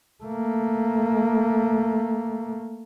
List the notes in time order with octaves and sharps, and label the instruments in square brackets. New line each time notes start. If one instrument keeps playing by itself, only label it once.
[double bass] A3 A#3